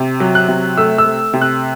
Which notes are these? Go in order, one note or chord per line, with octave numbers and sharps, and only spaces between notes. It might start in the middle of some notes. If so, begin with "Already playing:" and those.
Already playing: C3
F#3
F#6
C3
A3 E6
E6
A3
C3
F#6